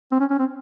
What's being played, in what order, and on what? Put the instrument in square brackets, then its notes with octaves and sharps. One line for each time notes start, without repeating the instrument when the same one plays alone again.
[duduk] C4
C#4
C#4
C4